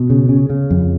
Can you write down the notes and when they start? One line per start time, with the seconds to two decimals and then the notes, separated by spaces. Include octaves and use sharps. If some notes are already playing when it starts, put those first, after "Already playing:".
Already playing: B2
0.10 C#3
0.29 C#3
0.50 C#3
0.70 F2